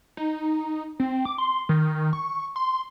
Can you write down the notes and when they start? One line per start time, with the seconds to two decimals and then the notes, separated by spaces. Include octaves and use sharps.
0.17 D#4
1.00 C4
1.25 D6
1.38 C6
1.69 D#3
2.13 C#6
2.56 C6